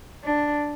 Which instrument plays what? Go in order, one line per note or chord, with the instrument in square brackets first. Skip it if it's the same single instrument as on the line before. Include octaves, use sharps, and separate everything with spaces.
[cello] D4